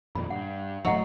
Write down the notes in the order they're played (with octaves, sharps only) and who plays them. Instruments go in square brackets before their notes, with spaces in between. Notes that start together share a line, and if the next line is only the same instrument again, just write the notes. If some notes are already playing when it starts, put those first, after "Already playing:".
[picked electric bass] F2 A#2 D#3 [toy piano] B5
[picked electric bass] G2 [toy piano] F#5
[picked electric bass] D1 A2 A3 [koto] F#3 [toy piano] E4 D#5 F#5